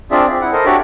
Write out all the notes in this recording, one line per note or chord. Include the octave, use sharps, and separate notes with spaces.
C4 D4 F4 G#4 D5 E5
C4
E4 F#5
A4 A#4 C5 D#5
D4 F#4 G4 C#5 D5 E5